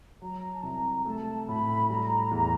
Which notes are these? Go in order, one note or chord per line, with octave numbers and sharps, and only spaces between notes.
F#3 A#5
A5
C2 A#5
A3 A5
A2 B5
G3 A#5
E2